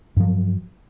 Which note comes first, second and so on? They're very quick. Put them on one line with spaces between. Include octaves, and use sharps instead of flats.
G2 F3 F#3